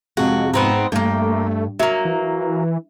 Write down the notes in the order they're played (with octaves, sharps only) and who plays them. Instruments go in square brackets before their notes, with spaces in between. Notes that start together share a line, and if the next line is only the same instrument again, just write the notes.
[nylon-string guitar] F2 C3 [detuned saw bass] G#3 [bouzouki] F#4
[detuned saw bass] G#2 [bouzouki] B3 C4 D#4
[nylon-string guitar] G2 [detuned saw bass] A3 [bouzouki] A#3 G5
[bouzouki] F#3 A#3 [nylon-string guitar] E5
[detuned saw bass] E3